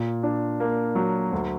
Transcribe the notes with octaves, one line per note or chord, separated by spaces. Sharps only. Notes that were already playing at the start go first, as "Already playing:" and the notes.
Already playing: A#2
D4
A#3
F#3
D2